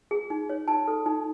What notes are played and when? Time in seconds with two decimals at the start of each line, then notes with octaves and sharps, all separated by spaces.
0.11 G#4
0.30 D#4
0.50 C#5
0.68 D#4 A5
0.88 A4
1.06 D#4